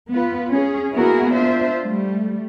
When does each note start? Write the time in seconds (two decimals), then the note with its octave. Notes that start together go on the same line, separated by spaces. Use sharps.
0.10 B3 F4 B4
0.50 C#4 G#4
0.94 A#3 B3 E4 F#4 G#4 A#4
1.33 D4 F4 C5 E5
1.82 G3 A3